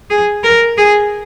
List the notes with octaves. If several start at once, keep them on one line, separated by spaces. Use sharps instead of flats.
G#4
A#4
G#4